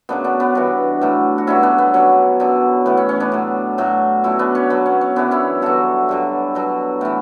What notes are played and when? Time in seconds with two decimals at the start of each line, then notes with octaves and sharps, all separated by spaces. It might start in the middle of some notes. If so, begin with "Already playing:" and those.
0.09 F#2 C#3 F#3 B3 D4
0.24 B3 D4
0.40 B3 D4
0.55 G2 E3 D4 F#4
1.01 A2 F#3
1.38 F#4
1.47 G2 D3 F#3 C#4 E4
1.63 B3 D4
1.78 B3
1.94 B2 F#3 C#4
2.40 F#2 D3 F#3
2.86 A2 E3 B3
2.97 C#4
3.09 C#4
3.20 B3 D4
3.32 A2 F#3
3.78 A2 F#3
4.24 B2 F#3 C#4 E4
4.39 B3 D4
4.55 C#4
4.70 B2 F#3 B3
4.86 C#4
5.01 C#4
5.16 F#2 E3 B3 D4
5.31 C#4 E4
5.62 G2 D3 F#3 F#4 A4
6.09 G2 D3 F#3
6.55 B2 F#3
7.01 A2 E3